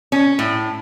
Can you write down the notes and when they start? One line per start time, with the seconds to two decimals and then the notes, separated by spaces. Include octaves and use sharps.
0.12 C#4
0.39 A2